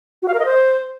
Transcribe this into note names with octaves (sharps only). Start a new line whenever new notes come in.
F#4
F5
A#4
D#5
C5